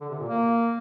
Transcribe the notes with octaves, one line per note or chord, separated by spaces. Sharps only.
D3
C3
A#2
A#3